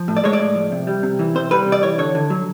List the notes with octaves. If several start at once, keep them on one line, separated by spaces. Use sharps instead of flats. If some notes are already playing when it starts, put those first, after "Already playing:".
Already playing: F3
A2
D5
G#3 C#5
D5
A2
F3
C3
G3
C3
E3
C3 C5
G3 B4
C3
D5
E3 C#5
D3 C#5
D3
F#3